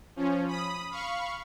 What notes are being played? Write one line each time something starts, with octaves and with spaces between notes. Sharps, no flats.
F3 C#4
B5 D#6
F5 B5 C#6